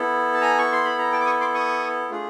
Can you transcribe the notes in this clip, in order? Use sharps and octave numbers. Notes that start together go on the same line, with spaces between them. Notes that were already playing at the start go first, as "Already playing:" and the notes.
Already playing: B3 E4 A4
A5
G#5 A#5
C#6
C6
B5
A#5
G5 A5
D6
C#6 D#6
C6 D6
C#6 D#6
A3 D4 F4 G#4